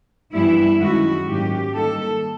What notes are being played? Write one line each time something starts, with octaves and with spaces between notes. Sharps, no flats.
G2 E3 G3 B3 E4
F#2 D#3 G#3 C#4 E4 F#4
G#2 D#3 F#3 A#3 C#4 G4
D#3 G3 A#3 A4